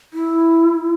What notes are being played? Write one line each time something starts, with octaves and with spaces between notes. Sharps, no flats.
E4